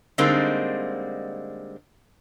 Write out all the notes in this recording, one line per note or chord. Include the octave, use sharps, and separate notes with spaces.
D3 G3 G#3 A#3 C4 D#4